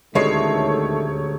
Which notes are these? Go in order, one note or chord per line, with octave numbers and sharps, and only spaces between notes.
D#1 D2 D#3 G#3 A3 C#5 C7